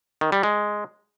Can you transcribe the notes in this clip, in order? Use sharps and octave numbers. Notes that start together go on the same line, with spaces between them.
D#3
G3
G#3